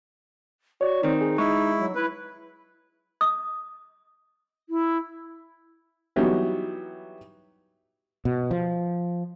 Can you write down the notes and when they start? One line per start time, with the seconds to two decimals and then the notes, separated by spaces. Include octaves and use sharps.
0.81 F#4 C#5 D5
1.03 D#3 C4 D#4
1.21 G#4
1.38 G#3 E4 C#6
1.79 F#3
1.95 E4 B4
3.21 D#6
4.69 E4
6.16 E3 F#3 G3 B3 D#4
8.25 B2
8.51 F3